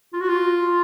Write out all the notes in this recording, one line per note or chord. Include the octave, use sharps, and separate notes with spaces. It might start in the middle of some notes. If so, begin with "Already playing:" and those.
F4
F#4
F4